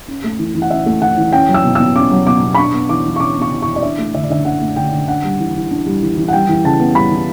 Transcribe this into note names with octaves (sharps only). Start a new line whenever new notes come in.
C#4
A3
E3
E3
F#5
C#4 E5
A3
E3 F#5
E3
C#4 G5
F#3
E6
B2
B2 E6
C#4 D6
F#3
B2 D6
B2
B5
D4 C#6
B3
E3 D6
E3
C#6
D4 D6
B3
C#6
E3
E3 C#6
D5
D4 E5
A3
D3 E5
D5
D3 E5
D4 F#5
A3
D3 G5
D3
D4 F#5
G3
E3
E3
D4
G3
E3
E3
F#5
G3 G5
E3
C#3 A5
B3
G3 B5
E3